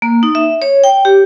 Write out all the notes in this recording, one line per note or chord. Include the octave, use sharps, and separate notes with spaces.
A#3
D#4
E5
C#5
G5
G4